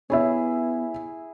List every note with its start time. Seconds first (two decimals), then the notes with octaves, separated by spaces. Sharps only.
0.10 B3 E4 G#4 C#5 E5